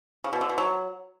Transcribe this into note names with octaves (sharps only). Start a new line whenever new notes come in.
C#3
B2
D3
B2
F#3